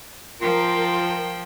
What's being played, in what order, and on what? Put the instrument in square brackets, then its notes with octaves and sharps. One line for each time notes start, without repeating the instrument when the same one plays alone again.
[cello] F3 [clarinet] F4 [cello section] A#4 [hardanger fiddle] G5